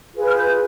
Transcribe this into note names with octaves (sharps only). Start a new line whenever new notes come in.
F4 G#4 B4
F6
G6